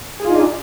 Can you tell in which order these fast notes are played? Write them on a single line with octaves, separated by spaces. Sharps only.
G#4 F4 D#4 D4